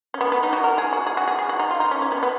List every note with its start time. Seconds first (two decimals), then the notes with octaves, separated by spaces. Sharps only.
0.14 C#4
0.21 B3
0.32 B3
0.43 D#4
0.53 F#4
0.64 A#4
0.78 G#4
0.93 F#4
1.07 G#4
1.17 F#4
1.28 G#4
1.39 G#4
1.49 F#4
1.59 D#4
1.70 F4
1.80 D#4
1.91 C#4
2.02 C#4
2.12 B3
2.23 B3